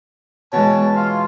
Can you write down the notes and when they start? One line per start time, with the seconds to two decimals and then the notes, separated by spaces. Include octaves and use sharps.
0.53 B2 E3 G#3 C#5 A5
0.96 F4 F5